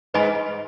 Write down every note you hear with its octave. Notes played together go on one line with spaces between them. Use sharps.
G#2 B4 D#5 G#5 B5